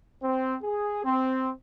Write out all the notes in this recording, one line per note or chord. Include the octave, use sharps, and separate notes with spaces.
C4
G#4
C4